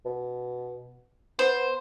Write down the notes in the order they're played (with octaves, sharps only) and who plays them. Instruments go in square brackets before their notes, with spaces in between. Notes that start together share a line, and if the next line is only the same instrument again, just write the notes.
[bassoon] B2
[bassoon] B3 [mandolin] C5